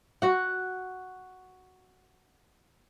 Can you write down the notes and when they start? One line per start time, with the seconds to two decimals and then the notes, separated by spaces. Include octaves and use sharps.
0.22 F#4 F#5